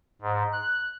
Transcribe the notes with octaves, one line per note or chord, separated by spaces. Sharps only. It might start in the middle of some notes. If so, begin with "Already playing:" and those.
G#2
F#6